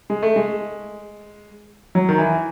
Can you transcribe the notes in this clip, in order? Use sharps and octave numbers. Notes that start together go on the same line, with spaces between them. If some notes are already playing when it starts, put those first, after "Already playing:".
G#3
A3
G#3
F#3
D#3
E3